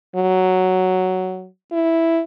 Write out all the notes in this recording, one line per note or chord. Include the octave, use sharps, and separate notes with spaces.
F#3
E4